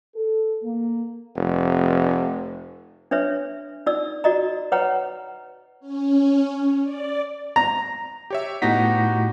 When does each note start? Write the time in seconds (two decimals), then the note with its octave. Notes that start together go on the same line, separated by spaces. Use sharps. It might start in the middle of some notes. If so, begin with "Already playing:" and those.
0.15 A4
0.64 A#3
1.36 F1
3.11 D4 B4 C#5 E5
3.86 D#4 D5 E6
4.24 F#4 D5 D#5 A#5
4.72 B4 C#5 F#5 A#5
5.80 C#4
6.83 D5
7.56 A#5
8.30 G4 C#5 E5
8.62 A2 B3 D#4 F#4 G4 A#6 B6